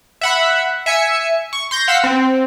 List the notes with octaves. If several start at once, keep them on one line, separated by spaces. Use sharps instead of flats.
E5 F#5 B5
E5 G#5 C#7
C#6
C6 G6 A#6
F5 F#5 E6 B6
C4